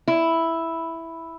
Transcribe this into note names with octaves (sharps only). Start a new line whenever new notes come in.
E4